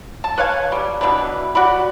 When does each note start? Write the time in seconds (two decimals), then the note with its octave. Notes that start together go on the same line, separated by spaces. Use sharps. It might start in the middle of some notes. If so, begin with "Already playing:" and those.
0.24 A5
0.38 B4 C#5 F5 G#5
0.72 G3
1.01 B2 E3 D4 B4
1.55 F#4 G4 D5 B5